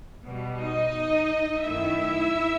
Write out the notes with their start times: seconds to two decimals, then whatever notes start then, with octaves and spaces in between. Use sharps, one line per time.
0.24 B2 G3
0.59 D#4 D#5
1.64 F#2 D#3 A3 E4 E5